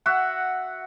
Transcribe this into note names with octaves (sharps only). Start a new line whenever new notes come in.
F#4 E5 F#5